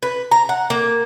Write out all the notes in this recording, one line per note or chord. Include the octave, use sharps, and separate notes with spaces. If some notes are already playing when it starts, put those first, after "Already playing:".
B4
A#5
F#5
A#3